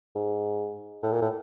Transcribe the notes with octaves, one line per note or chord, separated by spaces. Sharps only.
G#2
A2
A#2
A2